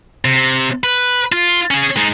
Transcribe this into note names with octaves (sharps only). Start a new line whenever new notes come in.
C3
B4
F4
C#4 G#4
G#3 D#4